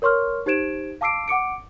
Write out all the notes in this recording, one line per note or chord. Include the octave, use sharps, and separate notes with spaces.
A#4 C#5 C6 C#6 F6
D#4 G4 C5 G#6 D7 E7
F5 A5 D6 E6 C7 D7
F#5 D6 C#7 D7